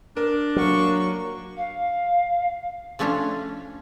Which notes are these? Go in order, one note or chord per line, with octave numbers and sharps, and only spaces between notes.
D4 A#4
F#3 A#3 C#6
F5
F3 A3 C#4 D4 F4